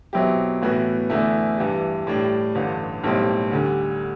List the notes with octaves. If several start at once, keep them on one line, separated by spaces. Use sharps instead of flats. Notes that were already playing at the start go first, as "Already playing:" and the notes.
B2 F#3 C4 E4 G4
A2 E3 B3 F#4
E2 D3 A3 E4
G2 E3 G3
A2 G3 D4
A1 G2 D3
B1 A2 G3 C4
D2 D3 G3